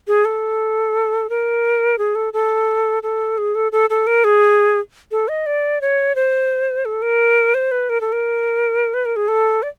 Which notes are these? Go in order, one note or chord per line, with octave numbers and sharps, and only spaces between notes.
G#4
A4
A#4
G#4
A4
A4
A4
G#4
A4
A4
A4
A#4
G#4
A4
D#5
D5
C#5
C5
A4
A#4
C5
B4
A#4
A4
A#4
B4
A#4
G#4
A4
D5